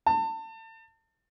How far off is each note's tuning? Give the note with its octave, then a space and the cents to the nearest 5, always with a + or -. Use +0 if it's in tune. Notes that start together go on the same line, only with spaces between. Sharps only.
A5 +30